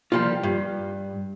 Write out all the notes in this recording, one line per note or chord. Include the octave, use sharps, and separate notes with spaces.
F3 G3 G#3 A#3 F4
G2